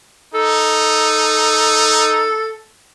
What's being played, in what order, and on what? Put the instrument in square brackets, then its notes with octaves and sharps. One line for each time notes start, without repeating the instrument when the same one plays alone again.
[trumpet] D#4 [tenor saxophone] A4